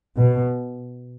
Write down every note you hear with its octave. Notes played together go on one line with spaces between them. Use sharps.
B2